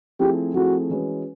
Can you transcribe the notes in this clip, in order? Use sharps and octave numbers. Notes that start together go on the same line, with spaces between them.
F3 A3 C4 E4 G4 G#4
F3 A3 C4 E4 F#4 G#4
E3 G#3 C#4 F#4 B4